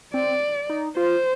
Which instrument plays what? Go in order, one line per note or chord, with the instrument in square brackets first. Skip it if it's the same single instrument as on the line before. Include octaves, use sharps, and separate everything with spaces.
[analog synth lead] C4 [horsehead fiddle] D5
[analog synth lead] D#4
[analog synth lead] F4 [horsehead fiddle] C5